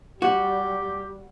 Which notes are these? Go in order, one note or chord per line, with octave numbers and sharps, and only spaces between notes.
G3 F#4 G4